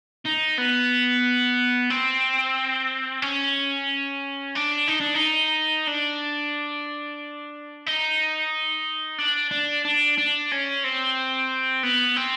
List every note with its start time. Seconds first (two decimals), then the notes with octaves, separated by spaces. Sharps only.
0.25 D#4
0.58 B3
1.90 C4
3.22 C#4
4.55 D4
4.88 D#4
5.01 D4
5.15 D#4
5.88 D4
7.86 D#4
9.18 D4
9.51 D4
9.85 D4
10.18 D4
10.51 C#4
10.84 C4
11.83 B3
12.16 C4